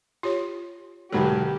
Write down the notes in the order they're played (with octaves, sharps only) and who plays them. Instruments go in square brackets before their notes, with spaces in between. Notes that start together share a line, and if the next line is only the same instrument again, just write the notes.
[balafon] F4 G4 C#5
[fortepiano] B1 G#2 F#3 [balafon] D3 A4 [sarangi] G4